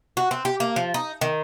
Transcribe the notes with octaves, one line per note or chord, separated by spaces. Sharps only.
F#4
C4
G4
A#3
F3
D#4
D#3